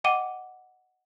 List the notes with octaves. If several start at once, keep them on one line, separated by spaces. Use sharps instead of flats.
D#5 F#5 G5 D6 D#7 G7